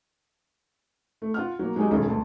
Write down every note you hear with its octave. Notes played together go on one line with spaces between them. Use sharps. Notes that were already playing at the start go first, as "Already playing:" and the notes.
A3
F4 F#5 F6
F#3 A#3
F#3 G#3 D#4 G4 G#4
E1 B1 F#2 D#3
G1 D2 A5